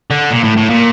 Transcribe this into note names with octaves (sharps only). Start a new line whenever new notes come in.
D3
A#2
A2
A2
A#2